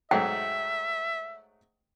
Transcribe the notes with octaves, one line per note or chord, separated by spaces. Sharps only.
G#2 F#3 A3 E5 G5